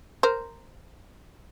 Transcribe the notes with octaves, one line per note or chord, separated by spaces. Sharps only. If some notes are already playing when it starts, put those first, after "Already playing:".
A#4 C5